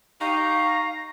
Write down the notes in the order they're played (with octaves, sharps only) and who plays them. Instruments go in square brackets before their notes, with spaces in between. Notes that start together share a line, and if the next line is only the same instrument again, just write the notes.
[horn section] D#4 G4 [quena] F5 [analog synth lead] A#5 [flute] C#6